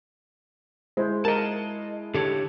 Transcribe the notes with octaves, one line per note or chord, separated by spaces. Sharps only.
G#3 E4 C5
A#4 D#5 A5
D3 G4 A4 C#5